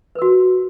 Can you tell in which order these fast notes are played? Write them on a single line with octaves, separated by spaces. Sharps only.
B4 A#4 F#4